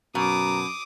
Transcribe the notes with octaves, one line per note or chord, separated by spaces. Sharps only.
F#2 B2 A#5 D6 D#6